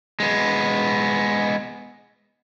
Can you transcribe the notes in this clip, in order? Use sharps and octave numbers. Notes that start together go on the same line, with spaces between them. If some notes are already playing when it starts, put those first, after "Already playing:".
G#3 B3